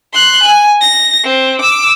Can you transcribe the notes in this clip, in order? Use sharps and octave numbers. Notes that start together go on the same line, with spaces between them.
C6 F#6
G#5
A#6
C4
D6 E6